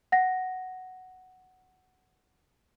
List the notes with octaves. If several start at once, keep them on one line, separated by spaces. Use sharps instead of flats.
F#5 A#6